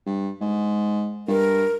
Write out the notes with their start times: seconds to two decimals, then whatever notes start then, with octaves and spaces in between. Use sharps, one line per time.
0.06 G2
0.41 G#2
1.28 G2 A#4